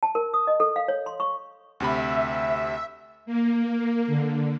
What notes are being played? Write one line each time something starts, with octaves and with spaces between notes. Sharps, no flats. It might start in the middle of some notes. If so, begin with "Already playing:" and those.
A5
A#4
D#6
D#5
A4
F5
C#5
C6
C#6
D2 C3 E5 B5
A#3
D3